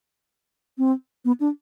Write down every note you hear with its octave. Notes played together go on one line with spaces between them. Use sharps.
C4
B3
D4